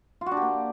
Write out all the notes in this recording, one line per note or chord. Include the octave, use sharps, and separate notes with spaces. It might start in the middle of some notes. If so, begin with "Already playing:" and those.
F4
F#4
D4
G4
A#3